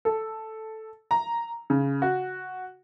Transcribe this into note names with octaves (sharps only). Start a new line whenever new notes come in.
A4
A#5
C#3
F#4